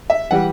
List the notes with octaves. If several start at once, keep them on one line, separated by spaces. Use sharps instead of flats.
E5
E3 G3 F#5